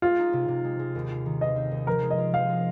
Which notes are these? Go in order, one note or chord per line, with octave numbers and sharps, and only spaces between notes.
G#3 F4
D#4
C3
C3
G#3
G#3
D#2
F4
D#3
F4 D#5
C4
D#2
F3 A#4
G#3
D#5
F4
F3 F5
F4